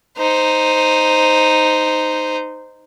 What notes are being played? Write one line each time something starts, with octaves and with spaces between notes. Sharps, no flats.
D#4 C5